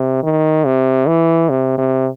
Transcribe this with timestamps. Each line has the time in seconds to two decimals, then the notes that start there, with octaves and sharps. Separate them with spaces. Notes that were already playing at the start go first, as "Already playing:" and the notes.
Already playing: C3
0.23 D#3
0.66 C3
1.08 E3
1.50 C3
1.78 C3